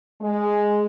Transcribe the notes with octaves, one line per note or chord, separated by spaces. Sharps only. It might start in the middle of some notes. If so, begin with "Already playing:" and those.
G#3